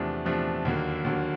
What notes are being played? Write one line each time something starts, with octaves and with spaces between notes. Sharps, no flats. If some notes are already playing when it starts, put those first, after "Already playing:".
Already playing: E2 C3 F3 A3 D4
E2 C3 F3 A3 D4
D#2 D3 F#3 A#3
D#2 D3 F#3 A#3